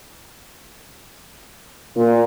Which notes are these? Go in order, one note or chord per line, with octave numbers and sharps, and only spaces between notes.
A#2